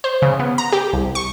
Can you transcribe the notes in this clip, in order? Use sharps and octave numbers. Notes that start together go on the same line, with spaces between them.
C5
C#3
B3
A#5
G4
C2
C#6